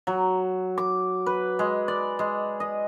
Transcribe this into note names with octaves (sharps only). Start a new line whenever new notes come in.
F#3
D6
B4
G#3
D5
G#3
D#5